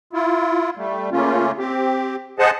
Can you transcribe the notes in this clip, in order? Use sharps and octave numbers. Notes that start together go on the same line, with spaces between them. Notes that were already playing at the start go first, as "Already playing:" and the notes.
E4 F4
G3 A3
C#3 A3 A#3 C#4 F4
C4 G4
G#4 C5 D#5 F#5 A5